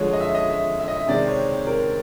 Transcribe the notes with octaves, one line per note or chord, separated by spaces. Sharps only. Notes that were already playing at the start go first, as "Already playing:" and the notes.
Already playing: D3 F3 G#3 C#5
D#5
E5
D#5
E5
E5
D#5
E5
C3 D#3 G#3 C4 D5
C#5
A#4